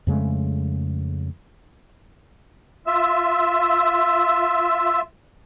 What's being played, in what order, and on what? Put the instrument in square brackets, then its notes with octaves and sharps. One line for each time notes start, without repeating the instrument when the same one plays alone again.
[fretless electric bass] F2 C#3 G#3 A3
[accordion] F4 E5 E6